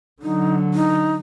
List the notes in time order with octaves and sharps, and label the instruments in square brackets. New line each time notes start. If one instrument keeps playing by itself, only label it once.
[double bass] D3 F#3 [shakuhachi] D#4
[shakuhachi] D#4